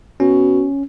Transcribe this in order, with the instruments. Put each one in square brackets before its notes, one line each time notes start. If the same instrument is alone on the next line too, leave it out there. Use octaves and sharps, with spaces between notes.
[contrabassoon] B2 [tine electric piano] C#4